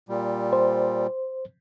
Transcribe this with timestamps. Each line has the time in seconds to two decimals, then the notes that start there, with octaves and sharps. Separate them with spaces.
0.09 A#2 G3
0.53 C5